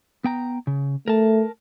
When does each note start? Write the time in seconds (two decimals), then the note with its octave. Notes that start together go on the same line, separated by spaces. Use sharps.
0.24 B3 G5 A#5
0.67 C#3
1.08 A3 A#4 A5